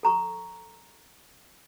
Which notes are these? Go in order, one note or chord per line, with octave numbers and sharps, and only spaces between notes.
A4 A#5 C#6